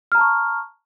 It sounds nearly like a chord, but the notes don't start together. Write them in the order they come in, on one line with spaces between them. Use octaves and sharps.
F6 A#5 A5 C#6